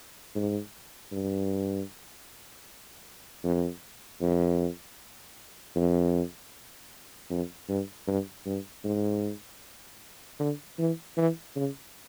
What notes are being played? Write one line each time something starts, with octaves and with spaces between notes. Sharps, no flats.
G#2
G2
F2
F2
F2
F2
G2
G2
G2
G#2
D3
E3
E3
C#3